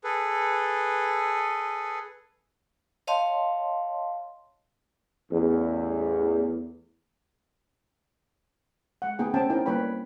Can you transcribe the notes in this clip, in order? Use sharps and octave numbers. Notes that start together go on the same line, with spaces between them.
G#4 A4 B4
C#5 D#5 F5 A5 C6
A1 E2
G#3 F#5
A3 B3 D#4 G#4 G5
C4 C#4 G5 A5
C4 D#4 E4 A#4 G5
G3 A#3 B4 C#5 G5 B5